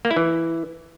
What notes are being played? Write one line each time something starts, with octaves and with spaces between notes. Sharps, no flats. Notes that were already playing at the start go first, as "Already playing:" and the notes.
A#3
E4
E3